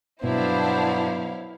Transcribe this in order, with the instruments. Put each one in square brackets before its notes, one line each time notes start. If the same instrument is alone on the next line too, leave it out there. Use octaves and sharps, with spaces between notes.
[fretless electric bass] G2 B2 [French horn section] F#3 B3 [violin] D4 C5 [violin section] E4 F5